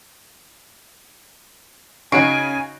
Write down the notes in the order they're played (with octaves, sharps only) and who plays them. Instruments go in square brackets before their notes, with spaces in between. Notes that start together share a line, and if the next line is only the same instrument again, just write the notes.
[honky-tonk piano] C#3 C7 D7 [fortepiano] D#4 F#4 C#5 [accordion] G#5 [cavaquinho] C#6